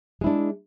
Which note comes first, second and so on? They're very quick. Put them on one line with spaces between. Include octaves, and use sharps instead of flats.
G#3 E4 D4